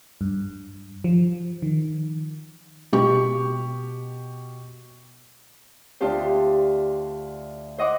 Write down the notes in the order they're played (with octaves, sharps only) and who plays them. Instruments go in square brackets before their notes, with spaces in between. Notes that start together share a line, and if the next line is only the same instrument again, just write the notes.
[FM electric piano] G2
F3
D#3
[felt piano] B2 G4 C#6
[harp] D2 D4 F4 G4 C5
C5 D#5 F#5 D6